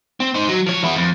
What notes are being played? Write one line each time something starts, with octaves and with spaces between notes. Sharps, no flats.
C4
D#4 C5
F#3
F3 C#5
B3 E4
F2